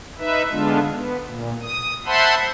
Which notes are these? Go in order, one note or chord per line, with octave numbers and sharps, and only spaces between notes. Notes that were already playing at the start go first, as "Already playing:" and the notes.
D#4 B4 E5
D3 G#3 B3 D4 F4
B3
A#2
D#6
C5 E5 F#5 A5 B5 C6